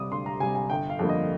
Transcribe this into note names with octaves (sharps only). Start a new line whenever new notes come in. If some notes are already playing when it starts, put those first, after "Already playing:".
Already playing: C3 G3 D6 D#6
D2 C6
A#5
C3 G3 G#5
G#5
G1 G5
F5
F2 D3 G3 A#3
D#5